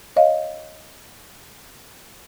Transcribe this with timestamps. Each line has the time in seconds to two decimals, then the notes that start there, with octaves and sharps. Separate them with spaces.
0.16 C#5 D#5 F5